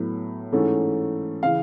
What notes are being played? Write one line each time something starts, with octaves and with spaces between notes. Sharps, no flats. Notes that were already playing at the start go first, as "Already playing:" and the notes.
Already playing: A2 F#3 B3
G#2 E3 A3 C#4
C#3 E3 F5